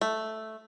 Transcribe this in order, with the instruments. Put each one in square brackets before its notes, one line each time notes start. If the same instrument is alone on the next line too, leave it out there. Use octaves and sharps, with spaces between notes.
[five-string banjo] A3